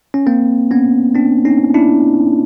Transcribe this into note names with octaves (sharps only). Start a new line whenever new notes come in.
C#4
A#3 C4
B3 C#4
C4 D4
C#4 D#4
D4 E4